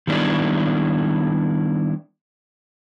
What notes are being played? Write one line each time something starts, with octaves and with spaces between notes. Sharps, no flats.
D#3 G3 B3 D4 E4